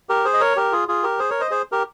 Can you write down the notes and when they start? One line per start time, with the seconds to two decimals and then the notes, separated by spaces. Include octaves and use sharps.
0.09 G4 A#4
0.25 G#4 C5
0.34 D#5
0.40 A#4 C#5
0.56 G4 A#4
0.72 F4 G#4
0.88 F4 G#4
1.03 G4 A#4
1.19 G#4 C5
1.30 A#4 C#5
1.40 C5 D#5
1.51 G#4 C5
1.72 G4 A#4